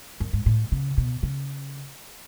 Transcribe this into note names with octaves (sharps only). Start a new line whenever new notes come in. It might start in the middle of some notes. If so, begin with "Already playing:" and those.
F#2
G#2
A2
C#3
B2
C#3